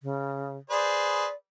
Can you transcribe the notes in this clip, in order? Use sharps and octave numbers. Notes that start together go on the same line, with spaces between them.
C#3
G#4 B4 C5 D5